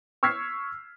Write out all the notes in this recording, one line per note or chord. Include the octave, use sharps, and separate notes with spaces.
C#6 E6 F6 G#6 B6 C7